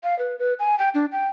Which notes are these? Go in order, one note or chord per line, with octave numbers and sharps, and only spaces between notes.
F5
B4
B4
G#5
G5
D4
G5